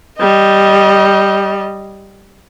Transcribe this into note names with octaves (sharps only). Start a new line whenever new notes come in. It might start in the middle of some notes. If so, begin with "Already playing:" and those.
G3 D#5